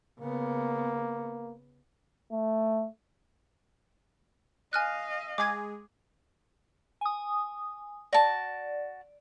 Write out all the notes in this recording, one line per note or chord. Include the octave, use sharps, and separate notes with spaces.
C#3 A#3 B3
A3
D#5 F5 G#5 F6 F#6
G#3 G#4 D6 G#6
G#5 D#6
F#4 D5 A5